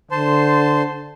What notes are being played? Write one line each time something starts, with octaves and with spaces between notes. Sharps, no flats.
D3 C5 A5 C6